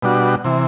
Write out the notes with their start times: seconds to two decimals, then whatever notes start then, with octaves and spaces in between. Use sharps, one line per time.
0.02 B2 G3 D4 F#4
0.44 C3 E3